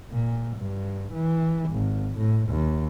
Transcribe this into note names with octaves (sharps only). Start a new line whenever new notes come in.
A#2
G2
E3
G#1
A2
D#2